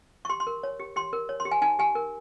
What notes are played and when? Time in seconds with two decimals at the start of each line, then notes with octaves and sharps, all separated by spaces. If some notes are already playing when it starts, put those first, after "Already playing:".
0.25 C#6
0.29 G4 C6
0.40 C6
0.47 A#4
0.63 C#5
0.80 G4
0.96 G4 C6
1.13 A#4
1.29 C#5
1.40 C6
1.45 G4
1.51 G#5
1.62 D#4 G#5
1.79 G4 G#5
1.95 A#4